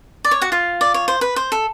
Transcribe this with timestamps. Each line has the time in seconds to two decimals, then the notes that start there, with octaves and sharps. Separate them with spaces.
0.25 D5
0.31 C#5
0.42 F#4 F#5
0.52 F4 F5
0.81 D5
0.94 C#5
1.08 C5
1.21 B4
1.36 C5
1.52 A4